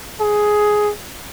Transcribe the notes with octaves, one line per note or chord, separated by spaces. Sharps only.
G#4